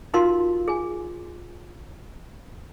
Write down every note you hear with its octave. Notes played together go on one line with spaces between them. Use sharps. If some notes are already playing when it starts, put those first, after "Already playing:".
D#4 F4 F#4 A#4 F5 C6
G#4 G#5